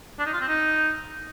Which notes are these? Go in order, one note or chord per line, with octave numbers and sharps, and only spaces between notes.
D4
D#4
F4
C4
D#4